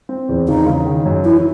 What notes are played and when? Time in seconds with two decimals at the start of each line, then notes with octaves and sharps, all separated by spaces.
0.09 C4
0.29 E2
0.48 C#3 D#4
0.66 C#3
0.86 D#3
1.05 F#2
1.25 E3 E4